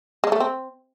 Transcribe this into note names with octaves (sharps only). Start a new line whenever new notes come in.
G#3
A3
C4